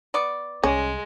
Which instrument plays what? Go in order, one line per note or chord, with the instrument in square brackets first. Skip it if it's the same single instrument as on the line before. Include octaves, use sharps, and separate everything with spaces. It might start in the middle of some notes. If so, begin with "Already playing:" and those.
[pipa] B3 D5 C#6
[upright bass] C2 [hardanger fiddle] G#3 [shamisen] C#4